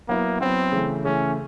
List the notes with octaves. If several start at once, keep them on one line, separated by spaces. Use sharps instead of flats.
F#3 A#3 B3 E4
F#3 B3 C4 E4
C#3 E3 A3
C#3 E3 A3 C#4